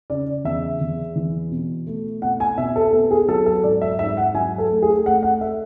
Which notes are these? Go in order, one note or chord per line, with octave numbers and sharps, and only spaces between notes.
C#3 D5
E2 E5
E2
E3
B2
A3
B2 F#5
G#5
B2 E5
A4
B3 A4
G#4
F#3 A4
A4
G#2 D5
E5
G#2 E5
F#5
F#3 G#5
A4
A3
G#4
A3 F#5
F#5
A3 E5